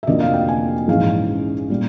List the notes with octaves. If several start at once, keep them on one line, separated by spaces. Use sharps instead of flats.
E5
F2 C3 F3 A#3 D4 D#5
F5
G5
G#5
A#1 G#2 E3 G#3 C#4 F5
A#2 G3